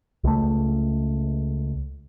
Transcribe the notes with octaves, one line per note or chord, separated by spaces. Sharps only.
C#2 A3